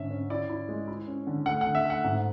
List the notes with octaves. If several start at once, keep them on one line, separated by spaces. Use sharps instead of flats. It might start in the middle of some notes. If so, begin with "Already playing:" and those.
Already playing: G#2 D3 C#4 E5
C#4
E4 D5
E4
G#3
E4
C#4
D3
A3 F#5
F#5
D3
E5
A3
F#5
G#2